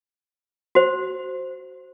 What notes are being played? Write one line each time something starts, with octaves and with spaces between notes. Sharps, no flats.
F#4 C5